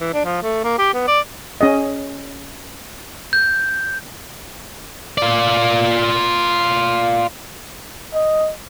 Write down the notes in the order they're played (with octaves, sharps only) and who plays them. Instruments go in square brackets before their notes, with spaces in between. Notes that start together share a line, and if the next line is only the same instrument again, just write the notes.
[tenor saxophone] E3
D4
F3
A3
A#3
G4
B3
D5
[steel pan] C#4 G#4 D#5
[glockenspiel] G6
[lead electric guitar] F4 D5
[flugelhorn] D#5